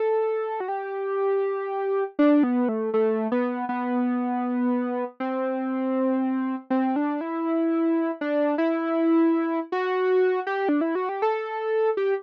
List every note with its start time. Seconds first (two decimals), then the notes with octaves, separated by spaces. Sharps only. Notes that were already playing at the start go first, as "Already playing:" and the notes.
Already playing: A4
0.60 F#4
0.68 G4
2.19 D4
2.43 B3
2.69 A3
2.94 A3
3.32 B3
3.69 B3
5.20 C4
6.70 C4
6.96 D4
7.21 E4
8.21 D4
8.58 E4
9.72 F#4
10.47 G4
10.69 D4
10.81 E4
10.95 F#4
11.09 G4
11.22 A4
11.97 G4